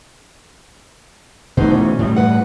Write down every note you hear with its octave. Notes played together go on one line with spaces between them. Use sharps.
B2 A3 D#4 B4 C5
E3 C#4
A2 G3
G2 B4 F#5